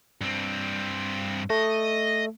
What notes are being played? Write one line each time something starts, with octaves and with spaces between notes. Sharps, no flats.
G2 C4
A3 D#5